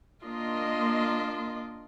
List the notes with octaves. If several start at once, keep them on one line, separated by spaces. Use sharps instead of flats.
A#3 D4 F4 D#5 C6